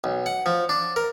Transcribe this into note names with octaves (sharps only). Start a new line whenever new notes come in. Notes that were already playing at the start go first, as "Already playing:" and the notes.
B1
F#5
F3
D4
A#4